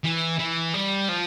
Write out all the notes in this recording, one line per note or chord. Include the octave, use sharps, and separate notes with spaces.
E3
E3
G3
F3